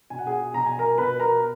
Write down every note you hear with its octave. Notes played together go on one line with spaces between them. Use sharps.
B2 G#5
F#5
G#4 G#5
B2 A#5
G#5
A#4 A#5
B2 B4 B5
A#4 A#5